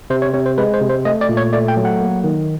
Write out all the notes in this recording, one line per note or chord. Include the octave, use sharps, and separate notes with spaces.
C3 C5
C#5
C3 C#5
C5
G#3 B4
C5
C3
C5
A3 D#5
D5
A#2
C#5
A3 D5
G5
F#3
F#5
A#3
D#3